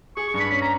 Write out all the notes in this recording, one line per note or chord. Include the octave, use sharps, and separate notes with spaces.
G#4 C#6
C#6
G2
B5
C#4 B5
A#5